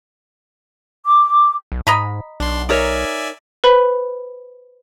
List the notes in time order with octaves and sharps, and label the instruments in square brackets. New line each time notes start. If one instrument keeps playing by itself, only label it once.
[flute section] D6
[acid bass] B1
[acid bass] G#2 [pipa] D#5 A#5 B5
[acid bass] B1 [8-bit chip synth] D4 C6
[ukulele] D#4 A#4 C#5 [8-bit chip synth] D5 E5 G#5
[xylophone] B4 C5 B5